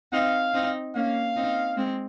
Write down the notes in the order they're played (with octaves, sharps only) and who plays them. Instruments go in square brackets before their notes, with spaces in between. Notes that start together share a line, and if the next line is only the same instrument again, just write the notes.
[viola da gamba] C4 D#4 [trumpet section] F5
[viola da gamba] C4 D#4
[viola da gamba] A#3 C#4 [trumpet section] F5
[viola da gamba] C4 D#4
G#3 C4